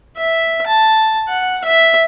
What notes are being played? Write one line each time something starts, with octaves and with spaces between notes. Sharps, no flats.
E5
A5
F#5
E5